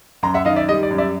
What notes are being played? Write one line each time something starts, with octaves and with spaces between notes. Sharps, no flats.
F#2 A#5 C6
E5 F#5
D#3 D#5 F5
D5 E5
G3 D#5
D5
F#2
D5 E5